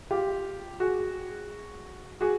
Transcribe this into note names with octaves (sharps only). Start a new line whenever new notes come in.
F4 G4
F#4 G#4
F#4 G#4